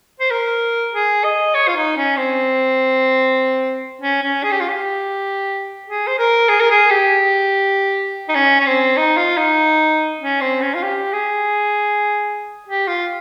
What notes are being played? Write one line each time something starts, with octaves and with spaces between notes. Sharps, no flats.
C5
A#4
G#4
D#5
C#5
F4
D#4
C#4
C4
C#4
C#4
G#4
G4
F4
G4
G#4
C5
A#4
G#4
A#4
G#4
G4
D#4
C#4
C#4
C4
D#4
F4
D#4
C#4
C4
C#4
F4
G4
G#4
G4
F4